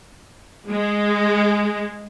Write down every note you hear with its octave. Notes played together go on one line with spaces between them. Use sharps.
G#3